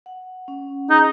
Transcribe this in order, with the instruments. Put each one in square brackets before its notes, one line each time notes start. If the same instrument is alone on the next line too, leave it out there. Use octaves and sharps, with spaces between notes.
[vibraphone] F#5
C#4
[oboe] D#4 [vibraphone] G#4